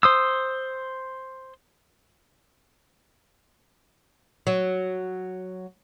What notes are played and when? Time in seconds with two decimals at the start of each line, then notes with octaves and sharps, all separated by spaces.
0.03 C5 D#6 E6
4.47 F#3